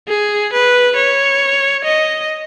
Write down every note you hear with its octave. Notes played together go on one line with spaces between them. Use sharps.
G#4
B4
C#5
D#5